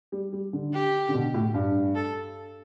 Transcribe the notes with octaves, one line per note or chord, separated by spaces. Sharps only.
G3
G3
D3
G4
D3
B2
A2
G2
A4